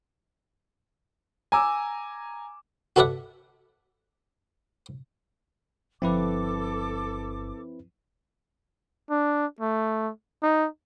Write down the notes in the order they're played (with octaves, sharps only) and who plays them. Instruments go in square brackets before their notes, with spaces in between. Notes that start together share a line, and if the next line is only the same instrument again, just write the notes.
[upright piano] G#5 A#5 D6 E6
[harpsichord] F#4 A4 B4 D5 E5 F#5
[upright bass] G1 [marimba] F3 [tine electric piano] C4 E4 B4 [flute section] A4 D6
[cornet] D4
A3
D#4